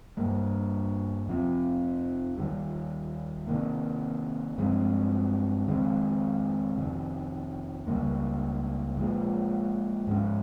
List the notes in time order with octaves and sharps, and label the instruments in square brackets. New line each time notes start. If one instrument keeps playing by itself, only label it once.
[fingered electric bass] G2 G3 A#3
F2 C3 F3 C4
D#2 D#3 G3
C3 D#3 A#3
G2 F3 G#3 C4
F2 D#3 G#3 C4
F2 C3 D#3
C#2 C#3 G3 A#3
A#2 F3 G#3
G#2 F3 G#3 C#4